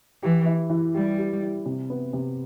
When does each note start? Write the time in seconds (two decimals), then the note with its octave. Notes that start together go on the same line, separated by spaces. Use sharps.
0.22 E3 G4
0.46 E4
0.70 E3
0.94 G3 G4
1.18 G4
1.42 E4
1.66 C3
1.90 B3
2.13 C3